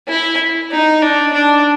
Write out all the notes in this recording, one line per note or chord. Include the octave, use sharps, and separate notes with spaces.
E4
D#4
D4
D4